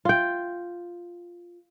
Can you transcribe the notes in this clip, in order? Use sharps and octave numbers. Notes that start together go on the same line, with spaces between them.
F4 G5